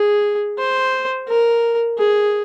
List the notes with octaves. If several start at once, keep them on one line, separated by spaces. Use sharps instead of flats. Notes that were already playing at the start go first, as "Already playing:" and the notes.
Already playing: G#4
C5
A#4
G#4